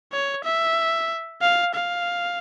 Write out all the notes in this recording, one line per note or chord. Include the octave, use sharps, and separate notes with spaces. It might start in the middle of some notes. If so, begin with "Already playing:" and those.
C#5
E5
F5
F5